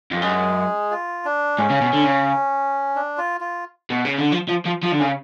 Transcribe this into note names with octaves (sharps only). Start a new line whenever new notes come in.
F2
F#2 G#3 G#4
F4
D4
G#2 C#4
C#3
B2
D3
C#3
D4
F4
F4
B2
C#3
D3
F3
F3
F3
F3
D3
C#3 C#4